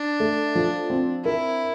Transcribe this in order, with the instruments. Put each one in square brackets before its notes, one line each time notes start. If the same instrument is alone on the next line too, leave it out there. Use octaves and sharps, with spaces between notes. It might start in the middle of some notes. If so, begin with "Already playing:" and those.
Already playing: [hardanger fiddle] D4
[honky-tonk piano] A3
F3
C4
[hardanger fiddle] E4 [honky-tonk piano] A#4